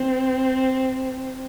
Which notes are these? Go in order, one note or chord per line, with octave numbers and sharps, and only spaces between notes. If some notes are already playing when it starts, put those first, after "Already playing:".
Already playing: C4